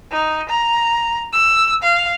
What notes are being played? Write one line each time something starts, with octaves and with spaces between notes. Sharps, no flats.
D#4
A#5
E6
F5